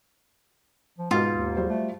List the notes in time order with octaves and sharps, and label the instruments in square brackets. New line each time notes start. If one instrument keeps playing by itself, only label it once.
[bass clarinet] F3
[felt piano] G#2 B2 B3 [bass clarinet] G#3 [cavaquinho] F4
[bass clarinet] D#2
[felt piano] G3 F#4 C5
[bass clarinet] A3